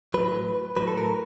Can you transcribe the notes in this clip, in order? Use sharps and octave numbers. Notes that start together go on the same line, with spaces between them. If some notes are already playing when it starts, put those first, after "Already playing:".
A2 F#3 B4
A2 F#3 B4
A4
A#4